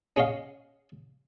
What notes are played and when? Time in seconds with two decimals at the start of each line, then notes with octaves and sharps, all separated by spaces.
0.16 C#4 G#4 C#5 D#5 F5